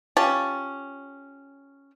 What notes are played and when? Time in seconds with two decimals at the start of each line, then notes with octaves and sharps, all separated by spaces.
0.17 C#4 F4 G4 A5